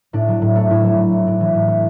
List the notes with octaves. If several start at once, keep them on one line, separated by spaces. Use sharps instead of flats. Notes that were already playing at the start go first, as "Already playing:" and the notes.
A2 D4
F#3
A2
A3
A2 E4
F#3
A2
A3
A2 D4
E3
A2
A3